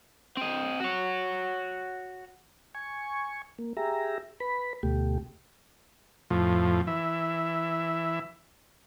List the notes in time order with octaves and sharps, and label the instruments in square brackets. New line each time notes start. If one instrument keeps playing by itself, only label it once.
[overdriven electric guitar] C4 D#5
F#4 C#5
[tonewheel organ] G#5 C#6
A#3
G4 G#4 E5 A#5
B4 B5
D2 B2 A3 G4
[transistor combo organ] F2 A2 F3
E3 E5